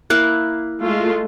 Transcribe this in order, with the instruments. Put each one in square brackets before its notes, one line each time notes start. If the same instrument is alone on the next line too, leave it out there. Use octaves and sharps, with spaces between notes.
[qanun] A#3 E4 F5 [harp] F#6
[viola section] G#3 A3 F4